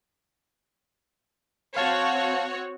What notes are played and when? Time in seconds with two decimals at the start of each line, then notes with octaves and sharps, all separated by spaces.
1.77 C4 F#4 C#5 F5 A5